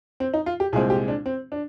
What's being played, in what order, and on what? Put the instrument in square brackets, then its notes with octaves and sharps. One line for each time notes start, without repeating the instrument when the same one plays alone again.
[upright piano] C4
D#4
F4
G4
C2 A#2 G#3 C4 G#4
G4
D4
C4
D4